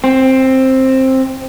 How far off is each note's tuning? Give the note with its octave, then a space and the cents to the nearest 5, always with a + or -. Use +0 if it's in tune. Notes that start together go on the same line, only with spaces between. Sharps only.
C4 +10